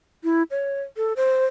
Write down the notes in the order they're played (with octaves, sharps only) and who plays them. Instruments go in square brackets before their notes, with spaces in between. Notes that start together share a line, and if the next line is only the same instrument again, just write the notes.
[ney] E4
C#5
A4
C5